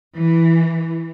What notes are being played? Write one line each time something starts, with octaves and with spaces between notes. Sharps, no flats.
E3